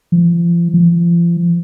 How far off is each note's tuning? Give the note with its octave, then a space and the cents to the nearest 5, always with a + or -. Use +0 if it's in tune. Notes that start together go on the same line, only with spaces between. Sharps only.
F3 -35
F3 -35